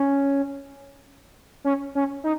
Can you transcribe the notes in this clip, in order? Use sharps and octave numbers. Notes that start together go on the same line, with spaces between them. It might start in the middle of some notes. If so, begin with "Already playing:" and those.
Already playing: C#4
C#4
C#4
D#4